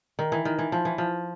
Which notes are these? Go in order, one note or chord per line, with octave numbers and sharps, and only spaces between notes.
D#3
E3
D#3
E3
F3
E3
F3